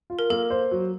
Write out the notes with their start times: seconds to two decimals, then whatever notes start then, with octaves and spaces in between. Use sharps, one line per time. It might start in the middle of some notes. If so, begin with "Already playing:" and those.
0.10 F4
0.19 A#4
0.30 A#3 A4
0.50 C5
0.71 F#3